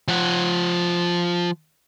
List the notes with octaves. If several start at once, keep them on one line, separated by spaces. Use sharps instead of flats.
F3 F#5